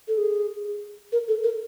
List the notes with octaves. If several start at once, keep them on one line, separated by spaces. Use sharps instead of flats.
A4
G#4
A#4
A4
A#4